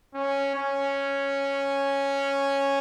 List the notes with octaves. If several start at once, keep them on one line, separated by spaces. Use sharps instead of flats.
C#4
C#4